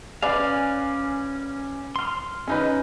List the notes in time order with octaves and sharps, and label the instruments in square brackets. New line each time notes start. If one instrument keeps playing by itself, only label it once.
[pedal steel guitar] C#4 F5 [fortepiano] B4 D5 G#5
[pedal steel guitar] C6 F6
[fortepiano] C#4 D#4 B4